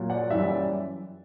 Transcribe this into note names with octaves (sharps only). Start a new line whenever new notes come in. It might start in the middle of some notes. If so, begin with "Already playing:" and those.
Already playing: A#2 F#3
D5 F#5
F#2 E3 G3 E5
D5